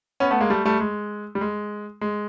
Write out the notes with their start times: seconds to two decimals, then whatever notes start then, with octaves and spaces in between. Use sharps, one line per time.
0.20 B3 C#4
0.31 A3 B3
0.41 G#3 A#3
0.50 G3 A3
0.65 G3 A3
0.80 G#3
1.35 G3
1.41 G#3
2.01 G#3